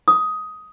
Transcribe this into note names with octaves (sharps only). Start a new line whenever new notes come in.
D#6